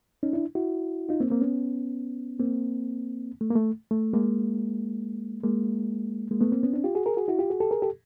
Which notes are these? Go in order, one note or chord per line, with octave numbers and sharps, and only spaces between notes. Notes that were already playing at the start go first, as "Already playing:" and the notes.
C#4 D#4
D4 E4
E4 F#4
D#4 F4
A#3 C4
A#3 C4
B3 C#4
A#3 C4
A3
A#3
A3
A3
G#3 A#3
G#3 A#3
G#3 A#3
A3 B3
A#3 C4
B3 C#4
C4 D4
F4 G4
F#4 G#4
G#4 A#4
F#4 G#4
E4 F#4
F4 G4
F#4 G#4
G4 A4
G#4 A#4
G4 A4